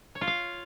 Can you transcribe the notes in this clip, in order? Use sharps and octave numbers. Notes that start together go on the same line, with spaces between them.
C#5
F4
F5